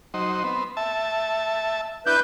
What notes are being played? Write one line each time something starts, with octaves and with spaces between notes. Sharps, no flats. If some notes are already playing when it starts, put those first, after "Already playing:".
F#3 D#4 C5
B3 C4
E5 A5
D4 E4 B4 G6